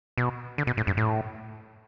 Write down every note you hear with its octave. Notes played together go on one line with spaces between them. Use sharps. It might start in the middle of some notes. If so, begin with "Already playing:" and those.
B2
D3
B2
A2
G2
A2